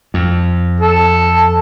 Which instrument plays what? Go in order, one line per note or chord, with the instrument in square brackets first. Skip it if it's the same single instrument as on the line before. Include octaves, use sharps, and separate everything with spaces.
[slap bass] F2
[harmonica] A4